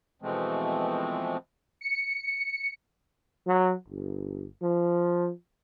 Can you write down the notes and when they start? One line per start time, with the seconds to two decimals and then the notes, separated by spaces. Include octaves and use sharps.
0.22 B2 E3 F3 G#3 A3 C4
1.81 C#7
3.47 F#3
3.89 G1
4.62 F3